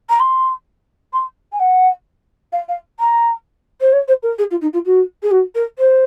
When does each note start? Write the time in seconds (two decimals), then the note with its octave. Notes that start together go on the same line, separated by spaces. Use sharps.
0.10 A#5
0.20 C6
1.13 C6
1.52 G#5
1.59 F#5
2.52 F5
2.68 F5
3.00 A#5
3.81 C5
3.93 C#5
4.08 C5
4.23 A#4
4.38 G#4
4.51 F4
4.61 D#4
4.73 F4
4.85 F#4
5.23 G#4
5.31 F#4
5.55 A#4
5.79 C5